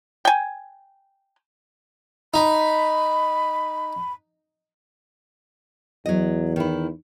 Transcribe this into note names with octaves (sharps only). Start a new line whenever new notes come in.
G5 G#5
D#4 B5
E2 F#3 D#5
D#3 E4